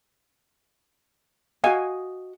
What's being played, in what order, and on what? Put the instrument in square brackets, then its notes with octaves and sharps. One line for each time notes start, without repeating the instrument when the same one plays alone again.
[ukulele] F#4 D#5 [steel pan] F5 G#5